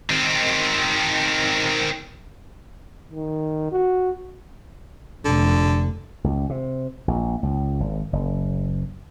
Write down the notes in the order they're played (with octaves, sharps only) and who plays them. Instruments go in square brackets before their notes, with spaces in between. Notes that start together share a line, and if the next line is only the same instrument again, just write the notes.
[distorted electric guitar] D#3 C4
[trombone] D#3
F#4
[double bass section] F1 [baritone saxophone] D3
[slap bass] C#2
C3
A#1
C#2
G#1
F#1